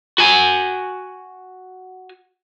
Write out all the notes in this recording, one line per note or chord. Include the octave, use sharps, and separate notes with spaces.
F#4 G#5